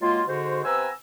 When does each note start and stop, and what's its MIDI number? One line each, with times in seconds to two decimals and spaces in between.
0.01 0.23 51
0.01 0.23 54
0.01 0.23 56
0.01 0.23 58
0.01 0.23 65
0.26 0.63 44
0.26 0.63 50
0.26 0.63 66
0.26 0.63 72
0.65 0.89 48
0.65 0.89 59
0.65 0.89 71
0.65 0.89 80
0.65 0.89 82
0.65 0.89 88